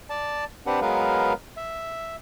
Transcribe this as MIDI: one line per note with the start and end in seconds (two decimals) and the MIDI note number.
0.10 0.45 74
0.10 0.45 81
0.67 0.80 60
0.67 0.80 62
0.67 0.80 67
0.67 0.80 71
0.67 0.80 78
0.81 1.33 54
0.81 1.33 56
0.81 1.33 59
0.81 1.33 70
0.81 1.33 71
0.81 1.33 77
1.57 2.16 76